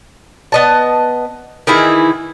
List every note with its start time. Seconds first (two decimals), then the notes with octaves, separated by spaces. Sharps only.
0.52 B3 D#5 A5
1.67 D#3 E3 E4 G#4